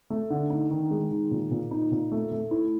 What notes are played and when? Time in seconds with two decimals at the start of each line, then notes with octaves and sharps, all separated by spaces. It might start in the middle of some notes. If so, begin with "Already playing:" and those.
0.10 A3
0.30 D3
0.50 D#4
0.71 D#3
0.91 G#3
1.11 D#3
1.31 A#2
1.51 A#2
1.71 D#4
1.92 A#2
2.12 A3
2.32 A3
2.51 E4